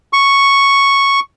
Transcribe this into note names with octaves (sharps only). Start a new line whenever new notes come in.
C#6